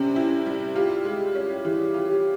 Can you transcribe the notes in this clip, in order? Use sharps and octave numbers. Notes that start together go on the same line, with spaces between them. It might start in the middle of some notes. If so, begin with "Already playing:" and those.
Already playing: C3 G3 C4 C#4
E4
G3
F4 G4
G#3
C#4
E3 G4
F4
G4